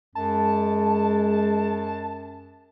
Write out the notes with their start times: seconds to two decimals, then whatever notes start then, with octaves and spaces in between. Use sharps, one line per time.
0.15 F#2 G#3 A5